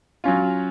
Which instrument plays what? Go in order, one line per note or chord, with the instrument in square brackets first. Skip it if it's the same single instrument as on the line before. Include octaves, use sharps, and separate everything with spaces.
[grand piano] F#3 C#4 F4